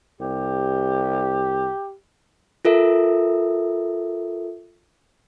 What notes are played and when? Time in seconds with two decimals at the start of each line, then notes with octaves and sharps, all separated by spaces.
0.21 C2 G4
2.65 F4 A4 A#4 E5